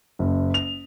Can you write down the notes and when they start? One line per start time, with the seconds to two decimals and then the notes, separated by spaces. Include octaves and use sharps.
0.19 F#1
0.54 F7